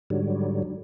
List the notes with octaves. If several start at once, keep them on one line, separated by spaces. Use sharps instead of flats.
G#2 D3 F#3 G3